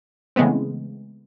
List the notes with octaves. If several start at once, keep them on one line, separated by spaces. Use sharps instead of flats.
C#3 E3 G#3 A3 B3 C4